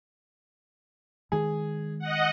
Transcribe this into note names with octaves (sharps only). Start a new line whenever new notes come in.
D#3 G#3 G#4
D#5 F#5